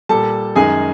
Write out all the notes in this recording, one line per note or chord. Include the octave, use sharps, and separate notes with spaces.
A#2 G3 A4 A5
F#2 D#3 G#3 G#4 G#5